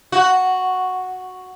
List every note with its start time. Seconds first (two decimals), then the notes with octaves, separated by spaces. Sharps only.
0.12 F#4